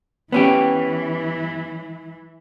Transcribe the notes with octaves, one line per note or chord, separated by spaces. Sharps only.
E3 B3 C#4 G4